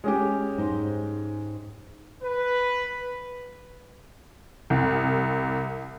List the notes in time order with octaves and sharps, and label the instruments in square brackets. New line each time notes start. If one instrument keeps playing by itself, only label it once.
[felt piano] G#3 C#4 G4
[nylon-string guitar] G#2 D#4 C5
[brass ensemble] B4
[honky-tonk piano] C2